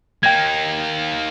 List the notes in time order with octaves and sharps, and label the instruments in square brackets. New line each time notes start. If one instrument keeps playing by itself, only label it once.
[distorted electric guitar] A#3 D#4 [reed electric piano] G5 G#6